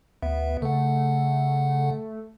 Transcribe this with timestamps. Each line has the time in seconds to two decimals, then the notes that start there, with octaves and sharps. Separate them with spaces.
0.22 D2 B3 E5
0.62 C#3 A3 F#5